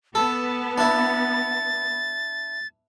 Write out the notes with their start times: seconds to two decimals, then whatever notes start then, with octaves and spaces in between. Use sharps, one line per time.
0.15 B3 A4 A5
0.78 D4 E4 A6